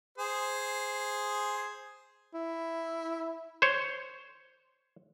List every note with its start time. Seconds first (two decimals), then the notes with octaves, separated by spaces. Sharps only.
0.18 G#4 C5
2.34 E4
3.62 C5 C#5